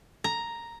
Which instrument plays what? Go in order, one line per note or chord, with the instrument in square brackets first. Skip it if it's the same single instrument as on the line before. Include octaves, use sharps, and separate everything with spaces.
[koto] A#5